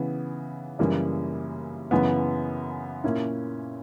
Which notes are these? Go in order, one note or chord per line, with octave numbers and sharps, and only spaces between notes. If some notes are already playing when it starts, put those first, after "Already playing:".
Already playing: C#3 E3 B3
F#2 C#3 E3 G3 A#3
F#2 C#3 E3 B3
A#2 A#3 C#4 E4